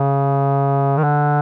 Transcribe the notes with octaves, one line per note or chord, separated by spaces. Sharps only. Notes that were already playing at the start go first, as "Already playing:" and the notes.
Already playing: C#3
D#3
D3